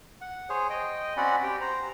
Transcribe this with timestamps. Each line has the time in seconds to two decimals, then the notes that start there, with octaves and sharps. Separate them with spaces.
0.21 F#5
0.50 G#4 C5 C#5
0.70 D#5 G5
1.17 C4 C#4 F#4 D5 F#5 B5
1.43 G4 G5
1.61 C5 A#5